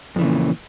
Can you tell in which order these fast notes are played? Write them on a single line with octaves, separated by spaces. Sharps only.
F2 E3 C#3 A#2